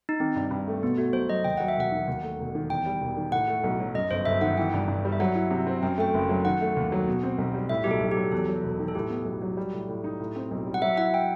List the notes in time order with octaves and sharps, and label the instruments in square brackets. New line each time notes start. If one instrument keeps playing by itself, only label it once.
[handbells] D#4
[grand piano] D#3 [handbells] C4
[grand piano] G2
G2
A3
[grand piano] B2 [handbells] B3
[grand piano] A3 [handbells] F#4
[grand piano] B1 [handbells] C5
[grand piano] F#3 [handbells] D#5
[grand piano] D#2 [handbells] G5
[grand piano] F#3 [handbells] F#5
[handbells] E5
[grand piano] E1 [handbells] F#5
[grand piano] D#3
D#2
A3
E1
D#3
[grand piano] E2 [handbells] G5
[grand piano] G3
E1
D#3
[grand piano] A2 [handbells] F#5
[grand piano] A3
B1
F#3
[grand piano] F#2 [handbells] D#5
[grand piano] G1 [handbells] C5
[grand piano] G1 [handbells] E5
[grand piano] D#3 [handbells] F#5
[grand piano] E3 [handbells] G5
[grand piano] G2
G2
G3
[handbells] E5
[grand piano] F#3 [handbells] F#5
[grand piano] E4
C3
C4
[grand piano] F#2 [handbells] G5
[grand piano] A3 [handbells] G5
[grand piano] F#1
F#3
[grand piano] D#3 [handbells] F#5
[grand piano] A3
D#2
F#3
B2
C4
B1
G3
[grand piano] A2 [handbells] E5
[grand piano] B1 [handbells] G4
[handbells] A4
[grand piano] B1
[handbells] G4
[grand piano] F#3
[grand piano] E2 [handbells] A4
[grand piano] F#3
E1
D#3
[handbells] A4
[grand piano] A2 [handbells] G4
[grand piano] B3
B1
F#3
G3
A2
A2
D#4
A2
C4
B1
G3
[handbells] F#5
[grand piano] F#3 [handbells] E5
[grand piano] E4 [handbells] F#5
[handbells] G5